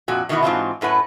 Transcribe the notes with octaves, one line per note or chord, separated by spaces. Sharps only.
F2 A#2 F#4
B2 D#3 E3 A#3 E4 F#4
G#2 E3 C4 F4 F#4 A5
F#2 A2 B4 F#5